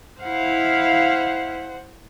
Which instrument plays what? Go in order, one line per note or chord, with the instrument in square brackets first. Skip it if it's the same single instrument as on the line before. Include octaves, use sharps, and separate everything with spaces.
[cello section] E4 F5 [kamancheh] C5 F#5